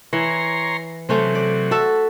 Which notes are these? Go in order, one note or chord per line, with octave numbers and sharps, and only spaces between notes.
E3 C#5 A#5 C6
C3 F#3 A3 C#4 C5
D5
F#4 A4 E5